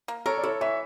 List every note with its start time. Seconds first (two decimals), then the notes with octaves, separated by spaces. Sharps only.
0.08 A#3
0.26 A4 A#4 C#5
0.38 D5
0.44 E4 A4 C#5
0.61 E3 C#5 E5